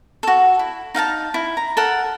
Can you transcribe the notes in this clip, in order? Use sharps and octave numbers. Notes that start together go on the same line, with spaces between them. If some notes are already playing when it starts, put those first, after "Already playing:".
F#4 A4
E4
D#4 F5 F#5 A5
E4
A#5
A4 A#4 F#5